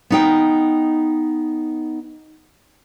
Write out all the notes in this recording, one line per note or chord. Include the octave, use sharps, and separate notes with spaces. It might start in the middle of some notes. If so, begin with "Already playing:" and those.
B3 D#4 G5